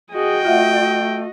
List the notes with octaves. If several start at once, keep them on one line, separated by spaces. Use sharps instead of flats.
F#4 G#4 D#5 G5
A3 F4 E5 F#5